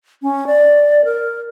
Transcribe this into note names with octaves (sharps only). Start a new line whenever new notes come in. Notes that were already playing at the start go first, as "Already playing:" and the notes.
C#4
D5
A#4